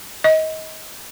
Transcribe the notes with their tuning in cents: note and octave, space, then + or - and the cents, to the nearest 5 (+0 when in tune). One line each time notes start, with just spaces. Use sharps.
D#5 +25